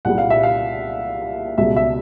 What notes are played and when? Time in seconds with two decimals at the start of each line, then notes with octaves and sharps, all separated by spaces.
0.05 C2 A#2 G3 F#5
0.18 F5
0.30 E5
0.43 F5
1.58 C#2 B2 G3 E5
1.76 E5